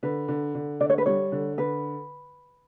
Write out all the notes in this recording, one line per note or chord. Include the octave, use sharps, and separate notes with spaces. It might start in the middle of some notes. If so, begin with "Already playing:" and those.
D3 B4
D3
D3
D3 D5
C#5
B4
G3 C#5
D3
D3 B4